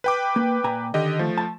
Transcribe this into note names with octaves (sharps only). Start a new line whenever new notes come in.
B4 G5 D6
A#3
A#2 G#5 A#5
D3 D#3 G4 D#5
F3 A3
A5